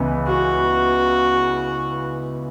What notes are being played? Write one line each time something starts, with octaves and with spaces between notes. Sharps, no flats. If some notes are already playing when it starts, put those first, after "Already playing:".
Already playing: C#2 C#3 E3 B3
F#4